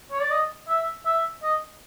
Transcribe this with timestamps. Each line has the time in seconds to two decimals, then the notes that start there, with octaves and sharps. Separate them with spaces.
0.11 C#5
0.22 D5
0.31 D#5
0.69 E5
1.05 E5
1.43 D#5